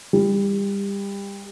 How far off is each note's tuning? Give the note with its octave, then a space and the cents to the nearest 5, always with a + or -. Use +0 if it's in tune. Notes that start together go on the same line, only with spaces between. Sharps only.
G3 +25